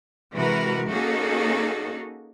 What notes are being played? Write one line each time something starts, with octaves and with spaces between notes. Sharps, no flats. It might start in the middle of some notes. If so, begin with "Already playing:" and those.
C3 E3 G#3 F#4 A#4 B4
A#3 C#4 D#4 F#4 G#4 A4